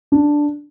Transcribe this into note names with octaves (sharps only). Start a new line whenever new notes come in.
D4